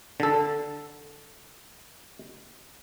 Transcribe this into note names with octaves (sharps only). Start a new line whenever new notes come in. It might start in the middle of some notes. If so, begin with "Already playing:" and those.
D3 A4